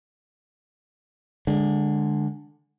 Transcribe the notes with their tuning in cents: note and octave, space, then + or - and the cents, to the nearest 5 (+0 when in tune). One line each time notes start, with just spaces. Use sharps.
D3 +10 G#3 -10